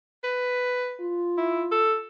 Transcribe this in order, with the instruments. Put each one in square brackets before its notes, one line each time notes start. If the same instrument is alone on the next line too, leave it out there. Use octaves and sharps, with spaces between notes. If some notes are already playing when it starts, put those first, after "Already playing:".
[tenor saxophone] B4
[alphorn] F4
[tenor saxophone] E4
A4